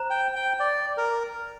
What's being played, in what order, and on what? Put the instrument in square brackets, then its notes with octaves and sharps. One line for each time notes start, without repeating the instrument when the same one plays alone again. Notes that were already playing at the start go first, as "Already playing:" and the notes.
Already playing: [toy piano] C5 A#5
[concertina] G5
G5
D5
A#4